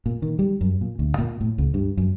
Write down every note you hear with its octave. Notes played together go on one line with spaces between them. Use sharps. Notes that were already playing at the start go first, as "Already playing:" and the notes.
A#2
D#3
G3
F#2
A#2
D2
A#2
A2
C#2
G2
F#2